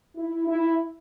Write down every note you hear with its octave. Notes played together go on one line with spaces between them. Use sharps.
E4
E4